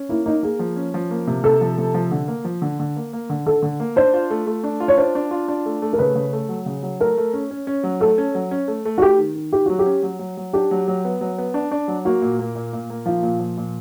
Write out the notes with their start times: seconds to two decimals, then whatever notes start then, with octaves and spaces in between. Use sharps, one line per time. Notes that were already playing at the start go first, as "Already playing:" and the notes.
Already playing: C#4
0.09 A#3 E4
0.26 A#3 D#4
0.43 A#3 G#4
0.59 F3
0.76 C#4
0.94 F3
1.11 A#3
1.27 C3
1.44 C3 A4
1.61 F3
1.78 C3
1.94 F3
2.11 D3
2.28 A#3
2.45 F3
2.62 D3
2.79 D3
2.96 A#3
3.13 A#3
3.30 D3
3.46 D3 A4
3.62 D3
3.80 A#3
3.96 D4 C5
4.14 F4
4.30 A3
4.47 A3
4.64 D4
4.80 F4
4.88 C#5
4.98 D4 C5
5.15 D4
5.31 F4
5.48 D4
5.66 A3
5.82 A3
5.93 A#4
5.98 C#3 B4
6.15 C#3
6.33 A3
6.49 F#3
6.66 C#3
6.83 F#3
7.00 A3 A#4
7.17 A3
7.33 C#4
7.51 C#4
7.67 C#4
7.83 F#3
8.00 A3 A4
8.18 C#4
8.35 F#3
8.51 C#4
8.68 A3
8.85 A3
8.98 F#4
9.02 A3 G4
9.18 D#3
9.35 D#3
9.52 D#3 G4
9.66 F#3 F#4
9.79 G4
9.86 C#4
10.03 F#3
10.19 F#3
10.37 F#3
10.53 D4 G4
10.71 F#3
10.88 F#3
11.05 B3
11.21 F#3
11.38 B3
11.54 D4
11.71 D4
11.88 F#3
12.05 A#3 F#4
12.22 A#2
12.39 A#3
12.55 A#2
12.73 A#2
12.90 A#3
13.06 F3 F4
13.23 A#2
13.39 F3
13.57 A#2